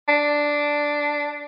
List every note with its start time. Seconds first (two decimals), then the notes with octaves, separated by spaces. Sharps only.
0.08 D4